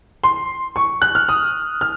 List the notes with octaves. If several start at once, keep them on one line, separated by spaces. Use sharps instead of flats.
C6
C#6
F#6
F6
D#6
F6